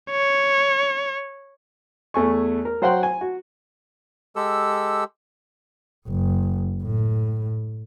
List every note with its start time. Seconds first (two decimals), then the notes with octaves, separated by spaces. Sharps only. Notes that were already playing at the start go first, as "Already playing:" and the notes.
0.11 C#5
2.14 E2 A3 G#5 C#6
2.65 A#4
2.82 F#3 C5 F#5 G5 C6 F#6
3.03 G#5
3.21 F#4
4.36 G#3 G4 A4 E6
6.08 F#1
6.83 A2